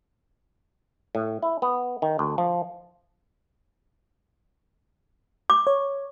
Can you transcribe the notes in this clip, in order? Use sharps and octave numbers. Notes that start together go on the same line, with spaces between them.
A2
E4
B3
D#3
D2
F3
D6
C#5